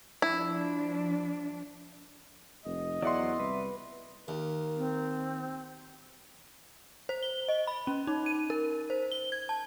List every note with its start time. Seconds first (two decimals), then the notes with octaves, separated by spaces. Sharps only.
0.22 F3 D4 E4
2.66 F1 D#5
3.02 E2 F#3 D5 E5 F#5 C6
3.40 C2 B4
4.28 D#2 A#4
4.77 C4
7.09 C5
7.23 G7
7.48 D#5
7.67 B5
7.87 C#4
8.07 D#4
8.26 D#7
8.50 A#4
8.90 C5
9.12 G7
9.32 G#6
9.49 A5